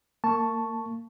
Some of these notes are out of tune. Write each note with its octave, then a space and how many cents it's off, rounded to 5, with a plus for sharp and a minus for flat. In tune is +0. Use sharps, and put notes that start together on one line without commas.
A#3 -30 A5 +0 C#6 +0